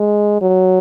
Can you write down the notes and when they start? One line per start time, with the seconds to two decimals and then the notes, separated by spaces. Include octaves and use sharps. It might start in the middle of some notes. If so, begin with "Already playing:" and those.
Already playing: G#3
0.41 F#3